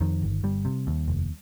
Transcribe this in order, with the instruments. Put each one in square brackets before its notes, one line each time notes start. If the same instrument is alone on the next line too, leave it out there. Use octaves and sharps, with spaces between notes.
[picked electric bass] F2 D#3
G1
G1 G3
C3
D#2
F1